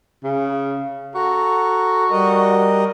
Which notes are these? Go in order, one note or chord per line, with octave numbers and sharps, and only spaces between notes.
C#3
F#4 A4 A#5
G3 A#4 D#5